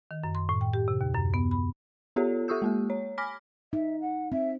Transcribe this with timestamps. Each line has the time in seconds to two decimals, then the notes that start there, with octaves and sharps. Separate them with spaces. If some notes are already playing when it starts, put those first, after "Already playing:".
0.11 D#3
0.24 F#2
0.35 C6
0.49 A2
0.61 G5
0.74 G4
0.88 C3
1.01 D#2
1.14 F#2
1.34 B3
1.51 B5
2.16 B3 F4 G4 A4 C#5
2.48 G4 A4 C#6 D#6 E6 G6
2.62 G#3 A#3 G4
2.90 C#5
3.18 G#5 B5 D6 F6 A#6 B6
3.73 D#4 E5
4.00 F#5
4.32 C4 E5